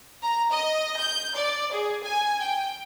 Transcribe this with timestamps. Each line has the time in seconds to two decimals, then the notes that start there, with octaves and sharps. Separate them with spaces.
0.22 A#5
0.51 D#5
0.99 G6
1.35 D5
1.73 G#4
2.02 G#5
2.41 G5